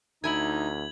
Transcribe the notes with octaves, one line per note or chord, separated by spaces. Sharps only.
D2 D#4 E4 G#5 G#6 F#7